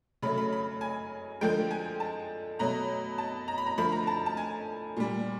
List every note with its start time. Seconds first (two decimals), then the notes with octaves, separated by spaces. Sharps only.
0.22 C#3 F#3 A3 B5
0.38 B5
0.53 B5
0.81 G#5
1.41 D3 F3 G#3 G5
1.71 G#5
2.00 A5
2.59 B2 F#3 A3 A#5
3.18 A5
3.48 A#5
3.58 B5
3.66 A#5
3.78 D3 F3 A3 B5
3.92 A#5
4.07 A5
4.26 A5
4.37 G#5
4.96 A#2 G3